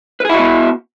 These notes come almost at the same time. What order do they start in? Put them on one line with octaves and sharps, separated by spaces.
B4 G#4 E4 F#4 B3